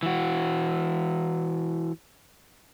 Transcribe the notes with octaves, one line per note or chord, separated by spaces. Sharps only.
E3 F#4